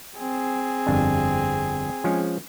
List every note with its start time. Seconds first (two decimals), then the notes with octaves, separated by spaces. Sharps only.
0.18 C4 G#4
0.86 G1 F2 D4
2.04 F3 G#3 C#4